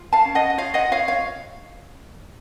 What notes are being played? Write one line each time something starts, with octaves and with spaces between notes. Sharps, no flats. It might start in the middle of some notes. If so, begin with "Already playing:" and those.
Already playing: F4
F5 A5
C#4
D#5 F#5
F#5
F4 C#5 F5
D#5 F#5
F4 C#5 F5
C#5 F5